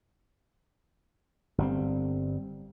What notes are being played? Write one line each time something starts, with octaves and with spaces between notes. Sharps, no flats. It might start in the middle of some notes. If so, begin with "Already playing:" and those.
G1 G3 C4